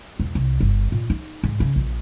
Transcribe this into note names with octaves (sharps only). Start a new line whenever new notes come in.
E1
C2
G1
A#2
D#4
G#2
C#3
A#1